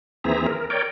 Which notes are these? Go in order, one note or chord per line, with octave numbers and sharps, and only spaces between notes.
D#2 E3 C4 G#4 E5 A#5
A#4
A#4 C#5 D5 G5